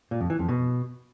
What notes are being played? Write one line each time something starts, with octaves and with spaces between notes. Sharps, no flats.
A#2
F2
E3
F2
B2